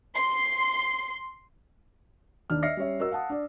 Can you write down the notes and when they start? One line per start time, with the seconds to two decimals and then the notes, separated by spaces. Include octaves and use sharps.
0.16 C6
2.50 D#2 D#3 D4 F6
2.63 D#5 E5 F6 A#6 C7 C#7
2.77 G3 C#4 C#5 E5
3.00 F#4 A#4 D#5 E6
3.11 F5 F#5 A5 D#6
3.30 D4 D5